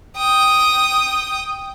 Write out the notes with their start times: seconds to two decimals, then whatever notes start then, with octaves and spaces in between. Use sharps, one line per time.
0.17 G5 D#6